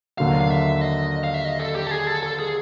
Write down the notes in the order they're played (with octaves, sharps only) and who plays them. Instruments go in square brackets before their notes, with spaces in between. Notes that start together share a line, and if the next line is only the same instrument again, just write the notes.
[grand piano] D#2 D3 F#3 [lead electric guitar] F5
[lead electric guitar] F5
E5
D#5
F5
E5
D#5
A4
G4
A4
G#4
A4
A4
G#4